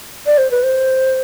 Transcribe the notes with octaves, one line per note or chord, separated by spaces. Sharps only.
D5
C5
B4
C5